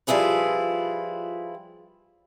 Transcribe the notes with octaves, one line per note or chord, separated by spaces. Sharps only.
F3 G3 E4 F4 G#4 B4